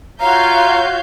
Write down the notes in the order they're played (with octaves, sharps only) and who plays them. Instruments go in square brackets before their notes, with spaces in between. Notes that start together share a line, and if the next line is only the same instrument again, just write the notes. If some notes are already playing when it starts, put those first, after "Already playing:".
[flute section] F4 F#4 C#5 [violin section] E5 F5 G6 [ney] A#5